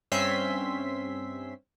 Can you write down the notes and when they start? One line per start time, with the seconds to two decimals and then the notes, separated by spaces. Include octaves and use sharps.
0.12 G2 C4 C#4 E5 C6 B6